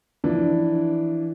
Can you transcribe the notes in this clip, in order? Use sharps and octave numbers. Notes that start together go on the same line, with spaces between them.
E3 F3 D4